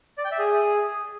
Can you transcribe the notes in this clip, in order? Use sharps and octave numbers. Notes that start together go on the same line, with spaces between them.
D5
G5
E5
G#4